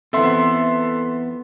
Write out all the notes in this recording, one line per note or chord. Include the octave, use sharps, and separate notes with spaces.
E3 B3 C4 A4 E5 C6